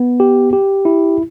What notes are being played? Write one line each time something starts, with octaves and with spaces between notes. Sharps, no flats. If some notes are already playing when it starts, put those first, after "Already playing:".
Already playing: B3
G4
G4
E4